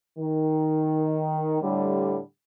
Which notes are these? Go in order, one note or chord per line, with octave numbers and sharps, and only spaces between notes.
D#3
A2 D3 G3